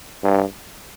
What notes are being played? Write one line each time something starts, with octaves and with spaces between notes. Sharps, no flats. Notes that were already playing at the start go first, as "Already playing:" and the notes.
G2